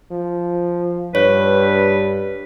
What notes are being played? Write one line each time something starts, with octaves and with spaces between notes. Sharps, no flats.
F3
G2 B4 C#5